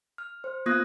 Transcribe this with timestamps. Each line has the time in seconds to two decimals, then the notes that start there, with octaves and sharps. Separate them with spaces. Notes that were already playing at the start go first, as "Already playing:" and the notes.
0.18 F6
0.44 C5
0.66 A#3 B3 F4 D#6 F#6 A#6